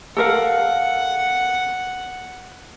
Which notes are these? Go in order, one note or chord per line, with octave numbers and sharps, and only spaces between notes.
A4 A#4 F5 F#5